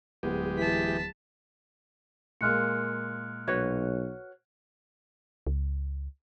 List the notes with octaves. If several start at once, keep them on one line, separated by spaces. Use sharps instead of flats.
D1 G#3 B3 G4
E3 A5 B6
A#2 G#3 A#3 F6 F#6 C#7
B1 F#4 B4 C#5
C#2